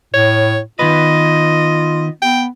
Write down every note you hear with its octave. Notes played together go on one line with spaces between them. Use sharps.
A2 C#5
D#3 B3 F4 B4 D#5
B3 G5